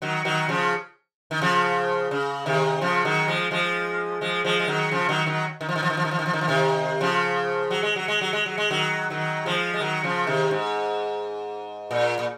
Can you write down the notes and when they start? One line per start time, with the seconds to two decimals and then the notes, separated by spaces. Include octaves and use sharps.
0.02 D#3 F#3
0.25 D#3 F#3
0.49 C#3 F3
1.31 D#3
1.42 C#3 F3
2.11 C#3
2.46 C3 D#3
2.81 C#3 F3
3.05 D#3 F#3
3.28 F3 G#3
3.51 F3 G#3
4.21 F3 G#3
4.45 F3 G#3
4.60 G#3
4.67 D#3 F#3
4.91 C#3 F3
5.09 D#3 F#3
5.26 D#3 F#3
5.61 D#3
5.69 F3
5.75 D#3
5.83 F3
5.90 D#3
5.97 F3
6.05 D#3
6.11 F3
6.19 D#3
6.26 F3
6.33 D#3
6.41 F3
6.48 C3 D#3
7.00 C#3 F3
7.71 F#3
7.83 G#3
7.96 F#3
8.08 G#3
8.21 F#3
8.33 G#3
8.46 F#3
8.58 G#3
8.71 D#3 F#3
9.10 D#3 F#3
9.45 F3 G#3
9.74 G#3
9.80 D#3 F#3
10.04 C#3 F3
10.27 C3 D#3
10.51 G#2
11.91 A#2
12.19 A#2